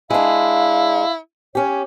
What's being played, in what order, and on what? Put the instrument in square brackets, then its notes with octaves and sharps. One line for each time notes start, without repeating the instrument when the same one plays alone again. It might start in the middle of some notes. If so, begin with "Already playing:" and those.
[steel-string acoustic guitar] G#3 D4 [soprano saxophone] E4 [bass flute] F5
[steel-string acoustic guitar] C#4 G4 [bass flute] C#5